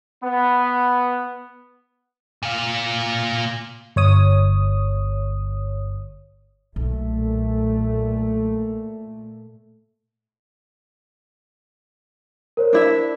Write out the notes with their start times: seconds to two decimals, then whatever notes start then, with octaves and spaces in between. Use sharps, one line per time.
0.23 B3
2.43 A#2 F4
3.96 G1 C#5 D#6
6.76 B1 A#2 A3
12.57 A#4 C5 C#5
12.73 D4 E4 E5